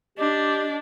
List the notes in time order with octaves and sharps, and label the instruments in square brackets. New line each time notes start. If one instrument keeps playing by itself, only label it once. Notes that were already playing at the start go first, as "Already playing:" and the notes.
[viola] D4 [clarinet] G4 [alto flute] D#5